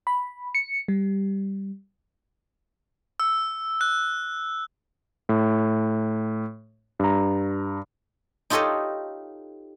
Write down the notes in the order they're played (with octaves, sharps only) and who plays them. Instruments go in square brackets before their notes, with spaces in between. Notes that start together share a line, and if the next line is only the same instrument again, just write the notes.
[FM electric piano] B5
C#7
G3
[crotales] E6
F#6
[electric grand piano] A2
G2 A#5
[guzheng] D#4 F4 G4 A4 C#5 D#5